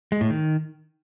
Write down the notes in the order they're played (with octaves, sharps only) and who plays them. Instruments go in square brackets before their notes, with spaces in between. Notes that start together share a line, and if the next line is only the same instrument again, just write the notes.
[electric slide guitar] G#3
A2
D#3